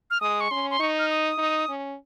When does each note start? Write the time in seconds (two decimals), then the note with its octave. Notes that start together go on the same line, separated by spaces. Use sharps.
0.11 F6
0.21 G#3 D#6
0.41 C#6
0.51 C#4 C6
0.70 C6
0.79 D#4 C#6
0.99 F6
1.10 D#6
1.38 D#4
1.69 C#4